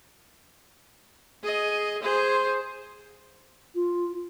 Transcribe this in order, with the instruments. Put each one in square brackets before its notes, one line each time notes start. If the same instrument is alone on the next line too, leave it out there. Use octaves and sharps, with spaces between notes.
[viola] G#4 D#5
G#4 C5
[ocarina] F4